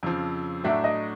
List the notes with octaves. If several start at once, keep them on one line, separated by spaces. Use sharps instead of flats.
F2 C#3 F3
A2 F#3 A3 D4 F#4 E5
D#5